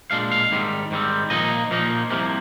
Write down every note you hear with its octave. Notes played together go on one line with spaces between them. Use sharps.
A#2 G#3 D4 F5
F5
G#2 D#3 G3 C4
G#2 D#3 G3 C4
A#2 F3 A#3 D#4 D#5
A#2 F3 A#3 D#4
C2 C3 F3 A#3